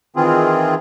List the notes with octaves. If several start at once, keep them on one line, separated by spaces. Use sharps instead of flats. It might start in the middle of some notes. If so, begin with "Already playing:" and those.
D#3 E3 C4 F4 G#4